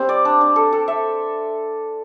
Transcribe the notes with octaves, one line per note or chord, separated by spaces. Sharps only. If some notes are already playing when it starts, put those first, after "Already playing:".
Already playing: G3 C4
D5
D4
D4
A4
A4
E5